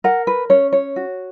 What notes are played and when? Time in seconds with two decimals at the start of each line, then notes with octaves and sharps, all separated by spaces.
0.04 A#4 F#5
0.27 B4
0.50 C#4 C#5
0.72 C#5
0.96 F#4